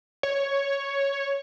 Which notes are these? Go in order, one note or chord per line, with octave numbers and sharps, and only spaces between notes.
C#5